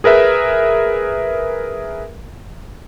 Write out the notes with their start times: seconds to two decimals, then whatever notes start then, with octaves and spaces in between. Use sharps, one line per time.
0.04 G#4 A#4 B4 E5